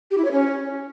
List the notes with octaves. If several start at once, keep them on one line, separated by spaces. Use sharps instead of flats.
G4
E4
C#5
C#4